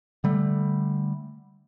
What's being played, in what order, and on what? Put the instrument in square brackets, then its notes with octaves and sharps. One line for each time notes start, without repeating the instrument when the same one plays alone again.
[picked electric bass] D3 G3 A3